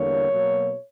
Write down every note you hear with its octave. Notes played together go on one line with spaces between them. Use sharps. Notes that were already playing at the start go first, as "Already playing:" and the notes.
Already playing: E2 D3 G3 A#3 C#5
B2 F#3 A#3